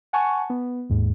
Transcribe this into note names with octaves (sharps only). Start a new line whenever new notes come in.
F#5 G#5 A5 C#6
B3
D#2 G#2